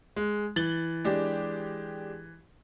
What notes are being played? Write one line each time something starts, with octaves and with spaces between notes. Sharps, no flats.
G#3
E3 A6 F#7 G7
G#3 D4 G4